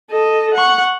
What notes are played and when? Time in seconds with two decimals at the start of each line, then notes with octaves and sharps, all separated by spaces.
0.11 A4 D#5
0.54 F#5 C#6